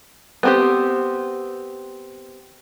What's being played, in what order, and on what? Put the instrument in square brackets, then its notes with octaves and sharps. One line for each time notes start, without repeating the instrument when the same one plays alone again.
[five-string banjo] B3 C4 G4